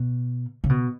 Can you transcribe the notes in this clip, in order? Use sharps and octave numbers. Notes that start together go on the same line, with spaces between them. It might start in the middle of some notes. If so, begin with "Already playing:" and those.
Already playing: B2
C#3
B2